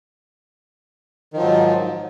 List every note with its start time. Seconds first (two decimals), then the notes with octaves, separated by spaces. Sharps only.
1.33 D#3
1.37 F3
1.40 F#3
1.43 G#2